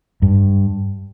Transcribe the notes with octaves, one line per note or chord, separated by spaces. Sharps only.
G2